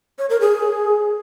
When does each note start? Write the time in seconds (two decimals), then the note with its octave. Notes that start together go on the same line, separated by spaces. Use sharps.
0.19 C#5
0.30 A#4
0.41 G#4